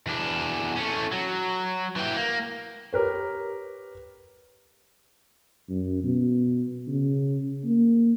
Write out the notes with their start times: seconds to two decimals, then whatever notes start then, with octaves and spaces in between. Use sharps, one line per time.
0.07 E2 D4
0.76 A3 C#4
1.12 F#3
1.96 E3 G4
2.16 A#3
2.93 G4 A#4 B4 C#5
5.69 F#2
6.04 B2
6.87 C#3
7.65 A#3